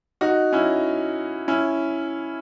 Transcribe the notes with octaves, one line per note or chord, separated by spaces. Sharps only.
D#4 F#4
C#4 E4
C#4 E4